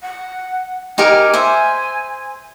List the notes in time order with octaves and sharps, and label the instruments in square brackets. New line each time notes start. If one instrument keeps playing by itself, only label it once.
[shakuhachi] F#5
[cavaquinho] D#4 G4 A#4 [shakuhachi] G#5
[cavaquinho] C5 E5